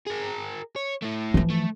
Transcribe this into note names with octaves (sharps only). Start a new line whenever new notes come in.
G#4 A#4
C#5
A3 E4
E3 F3
A3